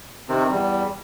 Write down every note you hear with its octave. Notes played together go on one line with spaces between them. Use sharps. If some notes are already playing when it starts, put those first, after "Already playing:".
C3 D#3 C4
E2 G3